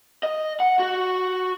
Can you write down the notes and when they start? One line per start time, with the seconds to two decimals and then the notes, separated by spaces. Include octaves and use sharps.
0.23 D#5
0.60 F#5
0.79 F#4